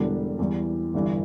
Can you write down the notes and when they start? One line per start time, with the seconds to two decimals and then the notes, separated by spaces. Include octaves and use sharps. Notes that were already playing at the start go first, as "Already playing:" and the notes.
Already playing: E1 E2 D3 G3 D4
0.39 E2 E3 G3
0.94 G1 G2 E3